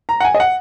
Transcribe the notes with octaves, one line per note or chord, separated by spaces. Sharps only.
A#5
F#5
G#5
D#5
F#5